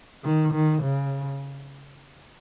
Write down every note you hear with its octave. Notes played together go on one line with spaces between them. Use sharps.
D#3
D#3
C#3